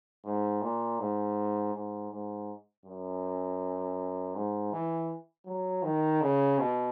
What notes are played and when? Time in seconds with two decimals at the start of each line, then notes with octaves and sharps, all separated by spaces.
0.25 G#2
0.62 A#2
0.99 G#2
1.74 G#2
2.11 G#2
2.85 F#2
4.35 G#2
4.73 E3
5.46 F#3
5.83 D#3
6.21 C#3
6.59 B2